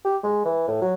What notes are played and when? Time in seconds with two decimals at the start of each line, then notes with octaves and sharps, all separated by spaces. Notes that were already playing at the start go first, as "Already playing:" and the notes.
0.05 G4
0.23 G#3
0.45 E3
0.68 A2
0.82 F#3